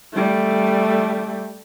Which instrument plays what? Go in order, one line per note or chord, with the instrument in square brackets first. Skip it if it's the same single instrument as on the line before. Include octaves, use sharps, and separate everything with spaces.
[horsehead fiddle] G3 A3